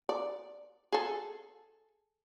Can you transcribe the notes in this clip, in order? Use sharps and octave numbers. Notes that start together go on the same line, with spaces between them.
D5
G#4 A4